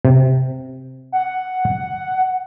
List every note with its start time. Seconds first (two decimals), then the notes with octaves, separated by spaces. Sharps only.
0.05 C3
1.12 F#5